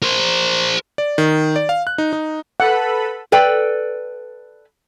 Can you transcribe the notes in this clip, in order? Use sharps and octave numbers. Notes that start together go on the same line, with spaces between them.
A#4 C5
D5
D#3
D5
F5
F#6
D#4
D#4
A4 B4 F#5 B5
A4 B4 D5 G5